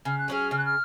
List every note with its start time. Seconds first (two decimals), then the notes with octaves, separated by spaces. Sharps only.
0.05 C#3 F6
0.18 F#6
0.28 F#3 C#4 G#4 F6
0.51 C#3 F6
0.58 F#6
0.65 F6